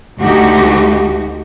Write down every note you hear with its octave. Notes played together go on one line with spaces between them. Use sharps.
D2 G#3 A3 D#4 F#4 G4